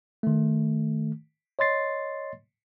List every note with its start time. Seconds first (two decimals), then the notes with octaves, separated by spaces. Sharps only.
0.23 D#3 A3
1.59 C#5 D#5 C6 A6 C7